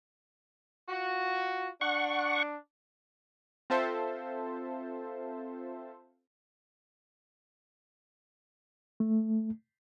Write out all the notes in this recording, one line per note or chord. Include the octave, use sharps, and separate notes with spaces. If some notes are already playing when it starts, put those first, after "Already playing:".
F4 F#4
D4 F#5 C#6
C4 F4 A4 C5 E5 A5
A3